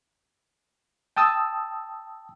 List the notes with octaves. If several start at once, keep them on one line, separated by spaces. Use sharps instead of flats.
G5 A5 D#6 E6